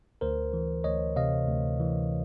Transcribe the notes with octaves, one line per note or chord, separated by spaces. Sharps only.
D2 A#4 C5
E3
D2 C#5 D#5
C3 D#5 F5
D2
E3